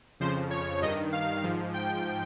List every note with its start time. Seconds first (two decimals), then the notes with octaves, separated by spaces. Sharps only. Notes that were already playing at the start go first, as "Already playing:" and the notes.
0.20 F2 C#3 F3 C5
0.50 C#5
0.82 G2 D#3 D#5
1.12 F5
1.44 G#2 F3
1.74 G5